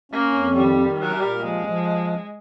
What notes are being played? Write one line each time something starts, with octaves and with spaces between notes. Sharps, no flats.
A#3 C#4
F2
D#3 G3
D#3
G3 A#4
A#2
F3 G#3
F3